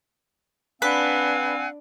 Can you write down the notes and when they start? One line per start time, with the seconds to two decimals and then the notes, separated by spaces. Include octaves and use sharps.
0.82 C4 D4 B4 F5 F#5 G#5